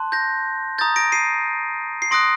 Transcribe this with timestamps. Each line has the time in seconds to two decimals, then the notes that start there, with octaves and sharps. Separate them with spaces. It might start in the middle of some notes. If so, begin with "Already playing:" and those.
Already playing: A5 C6 F#6
0.12 G6 A#6
0.78 A#5 D#6 G6 A6
0.96 A#6 D7
1.12 C7 D#7
2.02 C7
2.11 C6 D#6 F#6 A#6 D7